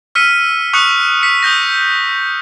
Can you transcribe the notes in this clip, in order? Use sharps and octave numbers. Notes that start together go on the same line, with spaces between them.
E6 F6 B6 C#7 D#7
C#6 D#6 F#6 C#7
B6 C#7
D#6 F6 G6 A#6